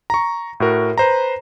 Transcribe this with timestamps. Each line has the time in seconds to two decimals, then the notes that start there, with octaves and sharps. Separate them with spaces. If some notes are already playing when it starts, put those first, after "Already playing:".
0.10 A#5 C#6
0.60 A2 F#4 A#4
0.98 B4 C5 A#5